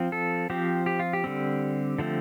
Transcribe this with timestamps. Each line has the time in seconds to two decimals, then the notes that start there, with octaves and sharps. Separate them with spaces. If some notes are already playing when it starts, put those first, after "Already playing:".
Already playing: F3 C4
0.12 A4
0.50 F3 C4 G4
0.86 G4
1.00 F4
1.13 G4
1.24 D3 G3 C4
1.98 D3 F3 A3 C4